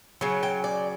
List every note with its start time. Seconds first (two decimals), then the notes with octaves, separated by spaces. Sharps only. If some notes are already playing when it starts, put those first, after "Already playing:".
0.21 C#3 F#3
0.43 G5
0.64 D5